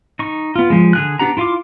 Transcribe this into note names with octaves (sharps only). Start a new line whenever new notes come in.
D#4 C#6
B3 F4
F3 G#3
D3 G#4 F#6
B3 D4 G4 F#5 A#5
E4 F4 F5 C6 D6